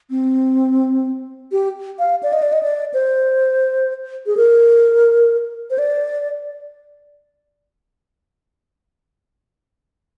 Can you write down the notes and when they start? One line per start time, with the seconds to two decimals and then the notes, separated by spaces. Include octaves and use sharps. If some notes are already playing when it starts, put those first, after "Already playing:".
0.10 C4
1.52 G4
1.99 F5
2.23 D5
2.33 D#5
2.42 D5
2.53 D#5
2.63 D5
2.94 C5
4.26 G#4
4.37 A#4
5.70 C5
5.78 D5